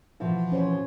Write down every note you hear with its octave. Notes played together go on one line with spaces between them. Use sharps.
B2 E3 F3
C#4 C5 C#5